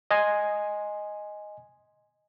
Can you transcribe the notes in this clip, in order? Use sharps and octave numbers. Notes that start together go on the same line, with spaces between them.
D#5 G#5 C6